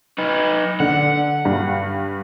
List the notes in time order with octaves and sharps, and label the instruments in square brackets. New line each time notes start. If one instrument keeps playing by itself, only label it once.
[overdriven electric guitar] D#4 B4
[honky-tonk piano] D3 [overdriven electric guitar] F#5
[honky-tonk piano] G2